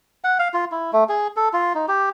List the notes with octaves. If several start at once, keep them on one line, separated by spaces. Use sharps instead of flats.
F#5
F5
F4
E4
A3
G#4
A4
F4
D#4
G4